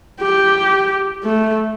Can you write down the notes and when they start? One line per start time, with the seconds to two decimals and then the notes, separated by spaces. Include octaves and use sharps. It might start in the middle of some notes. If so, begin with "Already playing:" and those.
0.21 G4
1.24 A3